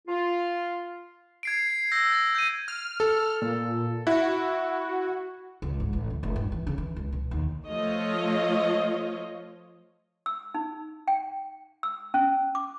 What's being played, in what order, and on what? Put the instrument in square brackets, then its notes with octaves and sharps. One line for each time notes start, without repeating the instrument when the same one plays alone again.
[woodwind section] F4
[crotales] G#6 C7 D7
C7
E6 G6 A#6
A6 A#6
G6 D#7
[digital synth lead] F6
[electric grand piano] A4
[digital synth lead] A#2
[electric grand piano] E4 [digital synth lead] F#4
[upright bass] C#2
G#2
A1
D2
F1
G2
E3
C#3
E3
C#2
B2
D#2
[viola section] F3 A3 F4 C#5 D#5
[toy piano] E6
D#4
G5
E6
C#4
D6